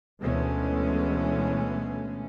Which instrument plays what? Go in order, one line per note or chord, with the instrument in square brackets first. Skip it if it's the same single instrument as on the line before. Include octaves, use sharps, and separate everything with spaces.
[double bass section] D2 B2 E3 G#3 A3 C#4